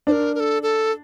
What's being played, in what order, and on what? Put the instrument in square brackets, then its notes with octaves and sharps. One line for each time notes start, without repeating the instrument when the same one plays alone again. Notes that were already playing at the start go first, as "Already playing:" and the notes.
[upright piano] D4 [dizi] C5
[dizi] A#4
A#4
A4
A4